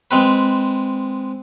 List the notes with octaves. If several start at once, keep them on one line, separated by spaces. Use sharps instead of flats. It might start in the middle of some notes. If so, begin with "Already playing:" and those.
G#3 C4 B4